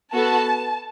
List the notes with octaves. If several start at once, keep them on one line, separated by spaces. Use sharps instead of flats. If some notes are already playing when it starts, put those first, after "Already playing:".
B3 F#4 A4 A5